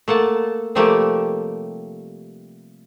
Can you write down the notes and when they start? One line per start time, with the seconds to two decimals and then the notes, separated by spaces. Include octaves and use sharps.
0.08 A3 A#3 F#5 A5
0.75 C3 F3 G3 A3 A#3 G4